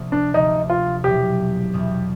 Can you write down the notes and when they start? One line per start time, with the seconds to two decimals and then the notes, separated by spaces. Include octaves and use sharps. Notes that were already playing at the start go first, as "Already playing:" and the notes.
Already playing: D2 C3 F3 A#3
0.12 D4
0.34 D2 C3 F3 A#3 D#4
0.70 F4
1.04 E1 E2 B2 F#3 G4
1.73 E1 E2 B2 F#3